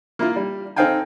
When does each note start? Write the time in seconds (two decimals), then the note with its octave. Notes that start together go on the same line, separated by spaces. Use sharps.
0.19 A#3 E4 F4
0.36 G3
0.76 C4 D#4 A4 F5 G5 G#5